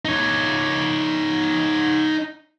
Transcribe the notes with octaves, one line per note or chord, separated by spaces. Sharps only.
D#4 C#5